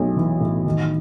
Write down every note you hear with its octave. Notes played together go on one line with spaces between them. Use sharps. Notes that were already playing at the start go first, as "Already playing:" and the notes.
Already playing: B1 A3
E3
A2
D#3